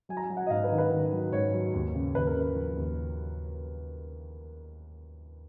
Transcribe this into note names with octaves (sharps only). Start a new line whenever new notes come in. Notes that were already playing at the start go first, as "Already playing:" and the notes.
F#3 G#5
A#5
G#5
F#3
F#5
D#5
G#2 F5
B4
D#3
B4
D#3
F#3
G#2 C#5
F#3
D#2
C#3
D#2 B4
A#4
C#3 B4
F3
D#2